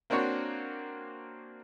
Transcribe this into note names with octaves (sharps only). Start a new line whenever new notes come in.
A#3 C4 D4 F#4 C#5